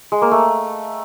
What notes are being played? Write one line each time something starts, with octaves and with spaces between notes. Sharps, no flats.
G#3
A#3
A3